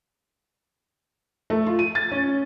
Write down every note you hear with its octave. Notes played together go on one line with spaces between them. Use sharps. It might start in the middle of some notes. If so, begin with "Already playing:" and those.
A3
F4
D#7
A6
C#4